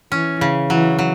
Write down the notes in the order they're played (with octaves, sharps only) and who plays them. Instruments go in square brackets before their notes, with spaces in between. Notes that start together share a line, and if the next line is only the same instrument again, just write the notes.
[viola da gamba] E3 [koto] C#4
[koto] C#3
[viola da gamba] E3 [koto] F#3
[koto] F#3